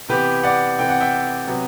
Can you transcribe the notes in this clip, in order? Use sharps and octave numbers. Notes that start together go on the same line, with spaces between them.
C3 E3 B3 G4 B4
D5 F#5
C3 E3 B3 G5
F#5
E5 G5
C3 F#3 B3